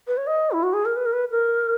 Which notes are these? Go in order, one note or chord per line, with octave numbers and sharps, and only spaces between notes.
B4
C#5
D#5
E4
F#4
G#4
A#4
B4
A#4
B4
A#4